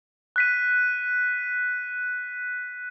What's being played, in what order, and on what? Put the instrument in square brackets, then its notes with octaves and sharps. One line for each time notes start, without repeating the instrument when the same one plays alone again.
[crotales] F#6 B6 D#7